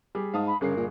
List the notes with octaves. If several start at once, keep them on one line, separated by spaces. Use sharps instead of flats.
G3 G4 G#4
G#2 F5 A5 D#6
B5
G1 C#3 G#4 A#4 C7
A#2